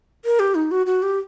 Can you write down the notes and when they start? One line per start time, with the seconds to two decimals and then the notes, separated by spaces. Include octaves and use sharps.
0.25 A#4
0.39 G4
0.55 D#4
0.71 F#4
0.86 F#4
1.02 G4